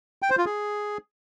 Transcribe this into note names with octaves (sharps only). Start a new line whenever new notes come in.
G5
C5
F4
G#4